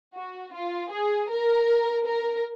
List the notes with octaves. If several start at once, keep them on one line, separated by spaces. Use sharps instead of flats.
F#4
F4
G#4
A#4
A#4